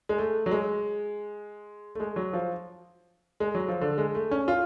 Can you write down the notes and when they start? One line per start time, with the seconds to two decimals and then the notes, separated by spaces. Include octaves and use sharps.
0.09 G#3
0.18 A3
0.46 F#3
0.51 G#3
1.95 A3
2.00 G#3
2.16 F#3
2.33 F3
3.40 G#3
3.55 F#3
3.68 F3
3.81 D3
3.98 G#3
4.15 A3
4.31 C#4
4.48 F4